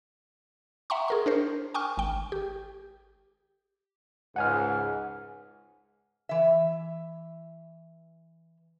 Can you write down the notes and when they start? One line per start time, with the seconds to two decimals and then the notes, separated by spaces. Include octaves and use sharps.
0.90 E5 F#5 G5 A#5 C6 C#6
1.08 G#4 A#4 C6
1.26 D4 A#4 C5
1.74 G5 G#5 C#6 D6 F6
1.98 G#1 G5
2.32 G4
4.36 C#2 G#2 F#5 G#5 F6
6.29 E3 E5